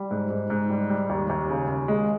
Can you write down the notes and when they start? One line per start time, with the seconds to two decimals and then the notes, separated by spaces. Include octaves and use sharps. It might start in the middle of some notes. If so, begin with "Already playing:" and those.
Already playing: G3
0.11 G#2
0.30 G#2
0.50 G#2
0.69 G3
0.90 G3
1.09 D#2
1.29 D#2
1.49 C#3
1.68 D#2
1.88 G#3